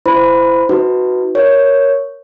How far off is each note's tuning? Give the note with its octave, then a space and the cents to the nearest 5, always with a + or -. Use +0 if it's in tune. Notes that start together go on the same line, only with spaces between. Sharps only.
E4 +25 C5 -25 B5 +0
D#4 +45 F#4 +0 B4 +0
A#4 +0 C#5 +0